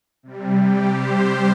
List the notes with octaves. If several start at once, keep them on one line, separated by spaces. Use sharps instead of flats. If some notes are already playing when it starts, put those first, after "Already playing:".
C3 G3
G4
G4 C5